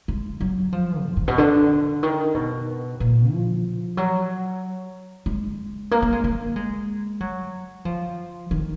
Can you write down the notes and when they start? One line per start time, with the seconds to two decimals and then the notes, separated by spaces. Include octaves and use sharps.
0.08 G#3
0.41 F#3
0.72 F3
1.05 G#2
1.17 G#2
1.28 B2
1.38 D3
2.03 D#3
2.35 B2
3.00 A#2
3.32 F3
3.97 F#3
5.26 G#3
5.91 A#3
6.02 A#3
6.12 G#3
6.24 A#3
6.56 G#3
7.20 F#3
7.85 F3
8.51 D#3